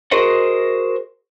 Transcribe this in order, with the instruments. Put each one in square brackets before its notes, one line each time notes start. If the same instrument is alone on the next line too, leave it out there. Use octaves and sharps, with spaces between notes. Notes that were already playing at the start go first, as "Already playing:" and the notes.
[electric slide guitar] F#4 G#4 A#4 C5 D#5 F#5